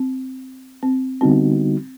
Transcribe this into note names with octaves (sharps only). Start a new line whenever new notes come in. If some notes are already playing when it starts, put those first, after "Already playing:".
Already playing: C4
C4
D3 G3 B3 C4 D#4 F#4